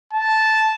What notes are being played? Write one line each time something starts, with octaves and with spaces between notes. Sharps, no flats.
A5